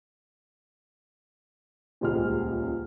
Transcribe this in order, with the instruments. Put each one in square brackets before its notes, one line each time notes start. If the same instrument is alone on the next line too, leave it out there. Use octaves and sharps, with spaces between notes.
[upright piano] D#1 C#2 G#4 F6